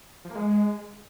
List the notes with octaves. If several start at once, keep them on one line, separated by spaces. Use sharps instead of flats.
F3
A#3
G#3